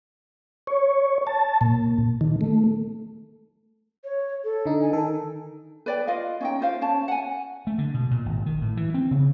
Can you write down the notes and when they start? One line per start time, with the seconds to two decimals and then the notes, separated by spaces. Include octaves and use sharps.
0.67 C#5
1.27 A5
1.61 A#2
2.21 D#3
2.41 A3
4.04 C#5
4.44 A4
4.66 D3 D#4
4.81 G#5
4.93 D#3 D#4 A4
5.86 B4 D5 G5
6.07 F4 D#5 F5
6.41 C#4 D#4 G5
6.61 F4 C5 F5
6.81 C#4 A5
7.08 F#5 G#5
7.67 A3
7.78 D3
7.94 B2
8.11 A#2
8.26 G#1
8.46 D#3
8.62 A2
8.77 E3
8.94 C4
9.11 C#3